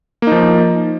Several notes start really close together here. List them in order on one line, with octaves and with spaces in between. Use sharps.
A#3 D#4 F3